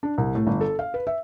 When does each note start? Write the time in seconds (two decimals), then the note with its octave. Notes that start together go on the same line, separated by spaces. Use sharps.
0.03 D4
0.18 C2
0.35 A2
0.47 G1
0.61 A4
0.79 F5
0.94 B4
1.07 E5